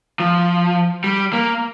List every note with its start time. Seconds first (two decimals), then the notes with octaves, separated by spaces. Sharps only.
0.20 F3
1.04 G3
1.33 A#3